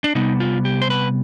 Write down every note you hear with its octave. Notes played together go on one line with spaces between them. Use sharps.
D4
C3 G3 B3 D#4
F4
G4
C5
B4